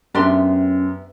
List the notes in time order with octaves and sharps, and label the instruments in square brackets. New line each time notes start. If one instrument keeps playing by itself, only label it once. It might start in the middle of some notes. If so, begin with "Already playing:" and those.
[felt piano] F#2 [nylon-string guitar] B3 E5 [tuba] C#4 [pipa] D4 G4 C6